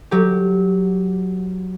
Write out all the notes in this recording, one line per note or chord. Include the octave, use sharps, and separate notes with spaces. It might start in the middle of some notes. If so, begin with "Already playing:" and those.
F#3 G4